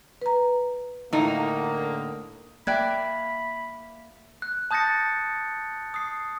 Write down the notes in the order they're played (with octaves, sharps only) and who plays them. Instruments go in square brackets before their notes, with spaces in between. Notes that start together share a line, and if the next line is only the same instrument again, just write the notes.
[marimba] B4 A#5
[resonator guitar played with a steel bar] A2 D#4 [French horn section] D3 A#3
[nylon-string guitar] A#3 D5 E5 [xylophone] G5 F#6 G#6 [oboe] B5
[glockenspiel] F#6
A5 D#6 G6 A6 A#6 C#7
D#6 C7